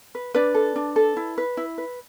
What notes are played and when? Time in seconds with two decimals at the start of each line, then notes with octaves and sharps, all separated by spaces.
0.15 B4
0.34 D4 B4 D5
0.54 A4
0.76 D4
0.96 A4
1.17 E4
1.38 B4
1.57 E4
1.78 B4